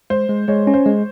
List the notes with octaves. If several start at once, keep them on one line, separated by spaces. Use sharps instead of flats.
G#3 C5
G#3
G#3 C#5
C#4
C5
G#3